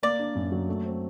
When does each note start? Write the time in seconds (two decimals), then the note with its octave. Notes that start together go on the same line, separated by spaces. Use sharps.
0.03 A#3 D5
0.19 D4
0.35 F#2
0.52 F#3
0.69 A3
0.85 C4